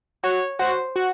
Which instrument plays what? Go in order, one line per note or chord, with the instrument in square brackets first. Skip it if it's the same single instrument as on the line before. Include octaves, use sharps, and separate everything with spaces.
[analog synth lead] F#4 [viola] C#5
[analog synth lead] F#4 [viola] C5
[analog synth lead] F#4